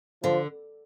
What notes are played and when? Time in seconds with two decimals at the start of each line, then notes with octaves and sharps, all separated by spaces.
0.23 D3 F3